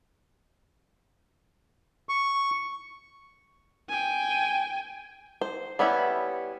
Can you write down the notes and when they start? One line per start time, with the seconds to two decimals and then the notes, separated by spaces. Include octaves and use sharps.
2.09 C#6
3.88 G5 G#5
5.41 C5
5.79 G3 B3 C#4 E4